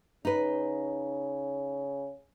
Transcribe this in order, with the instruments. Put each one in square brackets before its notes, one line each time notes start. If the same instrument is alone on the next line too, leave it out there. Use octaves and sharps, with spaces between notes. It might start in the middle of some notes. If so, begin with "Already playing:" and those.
[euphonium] C#3 [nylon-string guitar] D#4 B4